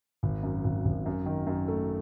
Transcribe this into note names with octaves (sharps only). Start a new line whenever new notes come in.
G#1
F#2
G#1
G#1
F#2
D#3
F#2
A3